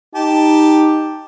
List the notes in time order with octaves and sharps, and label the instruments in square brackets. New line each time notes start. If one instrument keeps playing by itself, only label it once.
[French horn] D#4 [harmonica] G4 A5